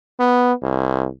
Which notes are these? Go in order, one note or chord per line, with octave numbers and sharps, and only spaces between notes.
B3
C2